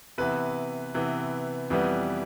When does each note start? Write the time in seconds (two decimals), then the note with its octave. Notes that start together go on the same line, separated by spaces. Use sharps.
0.18 C3 E3 B3 B4
0.94 C3 E3 B3
1.70 F2 E3 G3 B3